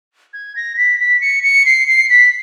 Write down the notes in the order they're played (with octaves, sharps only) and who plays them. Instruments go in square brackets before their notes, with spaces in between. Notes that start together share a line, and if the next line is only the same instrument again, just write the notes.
[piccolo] G#6
A#6
B6
B6
C#7
C#7
C7
C7
B6